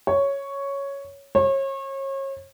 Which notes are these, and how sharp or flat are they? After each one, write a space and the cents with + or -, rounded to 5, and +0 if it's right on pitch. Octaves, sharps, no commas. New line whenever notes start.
C#5 +0
C#5 -35